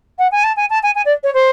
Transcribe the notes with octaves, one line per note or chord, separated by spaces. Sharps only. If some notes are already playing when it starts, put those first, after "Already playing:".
F#5
G#5
A5
G#5
A5
G#5
G#5
D5
C#5
C5